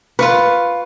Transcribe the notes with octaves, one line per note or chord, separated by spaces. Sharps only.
F4 B4 F5 C#6